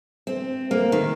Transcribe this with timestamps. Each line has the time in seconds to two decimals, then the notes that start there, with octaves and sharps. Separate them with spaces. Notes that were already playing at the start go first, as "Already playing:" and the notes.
0.27 C4
0.71 A#3
0.92 D#3